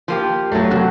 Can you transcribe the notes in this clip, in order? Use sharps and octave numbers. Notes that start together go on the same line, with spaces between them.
F3 A#3 G4
F#3 A3
F2 C3 F#4